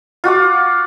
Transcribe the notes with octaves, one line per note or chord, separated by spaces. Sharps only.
F4 F#4 F#5 D6